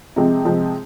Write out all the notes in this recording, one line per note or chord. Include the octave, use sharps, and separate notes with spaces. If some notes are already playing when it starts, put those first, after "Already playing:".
C3 F3 G#3 C4
C3 F3 G#3 C4